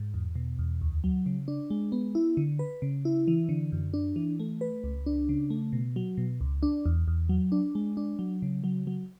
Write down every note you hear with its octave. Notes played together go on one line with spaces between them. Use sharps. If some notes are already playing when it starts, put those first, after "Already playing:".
Already playing: G#2
E2
B2
E2
D2
F#3
C#3
D4
G#3
B3
E4
D3
B4
C#3
E4
E3
D3
F#2
D4
E3
A3
B4
C#2
D4
C#3
A3
B2
F#3
B2
C#2
D4
E2
E2
F#3
D4
G#3
D4
F#3
C#3
F#3
F#3